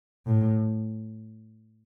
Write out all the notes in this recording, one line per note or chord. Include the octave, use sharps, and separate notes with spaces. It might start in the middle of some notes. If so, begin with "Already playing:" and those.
A2